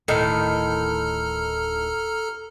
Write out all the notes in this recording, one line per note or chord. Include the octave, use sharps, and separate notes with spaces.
D1 A2 D#3 A4 A#5 F6